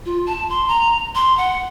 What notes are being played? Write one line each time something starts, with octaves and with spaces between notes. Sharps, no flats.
F4
A5
C6
A#5
C6
F#5